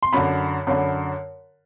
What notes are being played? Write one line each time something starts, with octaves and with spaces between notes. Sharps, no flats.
C6
F#2 D3 B5
F#2 D3